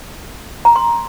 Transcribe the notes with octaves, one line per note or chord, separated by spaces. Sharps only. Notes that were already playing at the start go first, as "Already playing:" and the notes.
A#5
C6